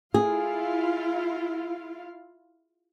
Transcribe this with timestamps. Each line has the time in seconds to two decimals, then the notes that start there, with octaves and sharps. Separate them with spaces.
0.14 E4 F4 G#4 F5